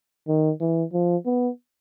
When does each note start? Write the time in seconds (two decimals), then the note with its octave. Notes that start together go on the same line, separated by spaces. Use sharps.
0.28 D#3
0.61 E3
0.94 F3
1.26 B3